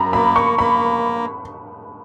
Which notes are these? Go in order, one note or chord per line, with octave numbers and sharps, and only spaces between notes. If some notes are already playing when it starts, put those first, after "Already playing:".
Already playing: F#2 A#5 B5
A#3 B5
C#6
A#3 B5